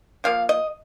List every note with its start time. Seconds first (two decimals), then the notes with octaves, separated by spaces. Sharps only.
0.24 F3 A#3 F5
0.49 D#5